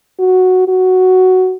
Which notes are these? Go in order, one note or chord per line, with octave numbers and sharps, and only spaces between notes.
F#4
F#4